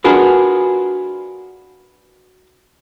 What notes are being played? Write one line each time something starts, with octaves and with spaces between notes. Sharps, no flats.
D4 F4 F#4 G#4 A#4 B4